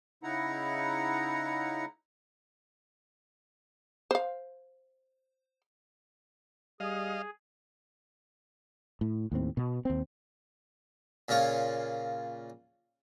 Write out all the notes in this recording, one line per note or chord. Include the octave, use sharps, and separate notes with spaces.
C#3 D#4 E4 F#5 A#5
C5 F5
G3 G#4 D#5 F5
A2
D#2 A2 C4
B2 B3
D#2 C4
A#2 C#3 F4 C#5